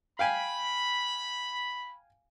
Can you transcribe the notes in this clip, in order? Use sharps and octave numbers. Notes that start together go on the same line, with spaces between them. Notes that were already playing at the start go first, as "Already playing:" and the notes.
F5 G5 G#5 B5